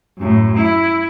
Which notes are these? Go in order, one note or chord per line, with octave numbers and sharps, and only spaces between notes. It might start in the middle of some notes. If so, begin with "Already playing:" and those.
F#2 A2
E4